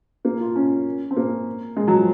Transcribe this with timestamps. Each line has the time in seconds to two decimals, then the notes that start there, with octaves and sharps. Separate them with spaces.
0.25 A#3
0.40 F4
0.56 C#4
1.11 C4
1.17 A#3
1.76 G#3
1.88 F#3
1.98 F3